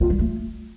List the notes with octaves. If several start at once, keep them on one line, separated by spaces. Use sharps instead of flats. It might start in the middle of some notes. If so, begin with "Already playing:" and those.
F4
G3
A3